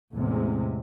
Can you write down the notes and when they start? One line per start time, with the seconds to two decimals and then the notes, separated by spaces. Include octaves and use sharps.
0.15 A1 E2 C3 G#3